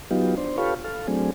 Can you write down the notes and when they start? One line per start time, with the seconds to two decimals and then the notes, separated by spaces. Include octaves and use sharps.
0.11 F#3 B3 D#4 F4 G4
0.38 D4 C5
0.58 F4 G4 A4 B4 C#5 F5
0.84 A4 F5
1.08 F#3 A3 C4 D4 G#4